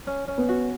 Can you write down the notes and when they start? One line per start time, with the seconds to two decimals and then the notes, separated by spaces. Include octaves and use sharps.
0.07 C#4
0.28 C#4
0.38 B3
0.49 F#4